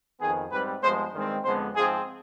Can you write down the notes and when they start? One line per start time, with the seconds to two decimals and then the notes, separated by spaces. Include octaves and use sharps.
0.20 F2 D#3 B3 G#4
0.52 G#2 G3 C4 B4
0.83 G2 F3 G#3 B3 C5
1.14 G2 D#3 G#3 C4
1.45 F2 D3 G#3 B3 C5
1.76 G#2 F3 C4 G#4